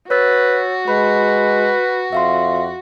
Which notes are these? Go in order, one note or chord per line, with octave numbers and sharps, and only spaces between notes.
F#4 B4 C#5 E6 A6
G#3 B4 B5
F2 E5 F5 C6